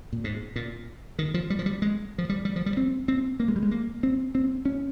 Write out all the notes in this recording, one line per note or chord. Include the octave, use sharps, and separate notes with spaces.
A#2
G#2
A#2
D#3
F3
G3
F3
G3
G#3
F3
G3
G3
F3
G3
C4
C4
A#3
G#3
G3
G#3
A#3
C4
C4
C#4